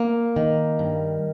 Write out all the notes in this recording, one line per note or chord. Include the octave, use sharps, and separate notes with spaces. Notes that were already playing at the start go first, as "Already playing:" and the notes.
Already playing: A#3
D#3
G2